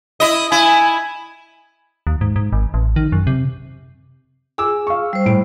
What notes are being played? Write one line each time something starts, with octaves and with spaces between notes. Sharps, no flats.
E4 D#5
E4 G#5
D#2
G#2
G#2
G#1
A1
D#3
F#2
C3
G#4 G#5 D6 E6
F5 C#6
G3 C5
A2 D7